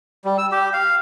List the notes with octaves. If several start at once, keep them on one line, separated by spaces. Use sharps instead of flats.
G3
E6
G4
F5